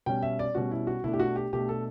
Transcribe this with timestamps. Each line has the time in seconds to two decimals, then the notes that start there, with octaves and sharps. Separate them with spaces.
0.06 B2 G3 C#4 G5
0.23 E5
0.39 D5
0.55 B2 G3 C#4 F#4
0.72 E4
0.87 F#4
1.04 B2 A3 D4 E4
1.13 G4
1.20 F#4
1.36 G4
1.53 B2 A3 D4 G4
1.69 A4